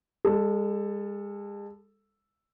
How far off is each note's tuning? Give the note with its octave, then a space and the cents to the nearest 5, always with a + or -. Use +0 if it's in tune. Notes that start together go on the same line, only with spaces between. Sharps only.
G#3 -40 A4 +0